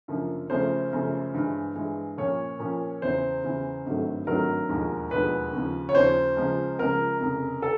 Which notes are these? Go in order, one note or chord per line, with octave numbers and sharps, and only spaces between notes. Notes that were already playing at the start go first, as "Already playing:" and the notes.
F#1 F#2 D3 F3 A#3
F#2 C#3 F3 A3 C5
F#2 C#3 F3 A3
G2 E3 G#3
G2 E3 G#3
A#2 F3 A#3 C#4 C#5
A#2 F3 A#3 C#4
E2 C#3 E3 C5
E2 C#3 E3
G#1 G2 D#3 F#3 A3
G#1 G2 D#3 F#3 A3 A#4
E1 D#2 D3 F3 G#3
E1 D#2 D3 F3 G#3 B4
D#2 C#3 F3
C#5
D#2 C#3 F3 C5
C#2 C#3 F3 G#3
C#2 C#3 F3 G#3 A#4
F1 F2 C#3
A4